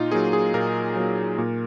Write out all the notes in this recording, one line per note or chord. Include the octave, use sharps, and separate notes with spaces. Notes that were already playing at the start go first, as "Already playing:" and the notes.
Already playing: A#2 D#4 F4
F#3 A#3 G#4
G#4
A#2 A#4
F#3 A#3
A#2